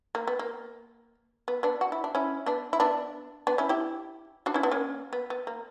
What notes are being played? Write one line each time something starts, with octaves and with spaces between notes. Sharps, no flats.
A#3
B3
A#3
B3
B3 D4
F#4
E4
D4
C#4 E4
B3 D4
E4
B3 D4
B3 D4
C#4 E4
E4 G4
D4 F#4
C#4 E4
B3 D4
A#3 C#4
B3
B3
A#3